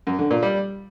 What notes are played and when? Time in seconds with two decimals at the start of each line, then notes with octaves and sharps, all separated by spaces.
0.07 F#2
0.19 D3
0.31 A#2
0.43 G3